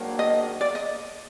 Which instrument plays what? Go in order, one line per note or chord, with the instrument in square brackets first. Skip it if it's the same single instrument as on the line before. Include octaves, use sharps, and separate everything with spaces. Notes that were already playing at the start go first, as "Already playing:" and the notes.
Already playing: [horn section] G#2 D#3 F#3 A#3 D4
[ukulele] D#5
D5
D#5